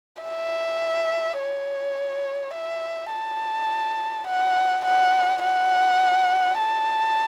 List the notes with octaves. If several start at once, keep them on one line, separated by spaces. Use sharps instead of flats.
E5
C#5
E5
A5
F#5
F#5
F#5
A5